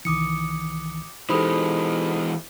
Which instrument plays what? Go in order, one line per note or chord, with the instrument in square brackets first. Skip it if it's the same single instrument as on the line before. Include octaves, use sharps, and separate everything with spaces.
[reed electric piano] C2 D#3 E3 [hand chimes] D6 D#6 C#7
[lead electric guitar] E3 G#3 [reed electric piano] D#4 G4 A4 [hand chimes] C5 B5 D#6